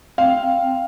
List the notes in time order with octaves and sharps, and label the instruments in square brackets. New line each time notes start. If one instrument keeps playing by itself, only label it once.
[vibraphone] C4 G5 [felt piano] F5